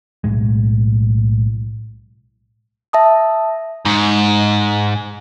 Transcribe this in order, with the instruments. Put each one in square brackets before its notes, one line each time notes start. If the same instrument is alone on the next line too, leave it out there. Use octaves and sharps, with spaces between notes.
[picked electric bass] B1 F2 A2 G#3
[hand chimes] E5 A5 D#6
[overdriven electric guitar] G#2